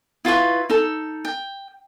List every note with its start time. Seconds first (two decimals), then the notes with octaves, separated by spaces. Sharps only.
0.25 E4 F4 B4 C#6
0.70 D#4 A4
1.25 G5